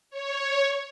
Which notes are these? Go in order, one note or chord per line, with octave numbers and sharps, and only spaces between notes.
C#5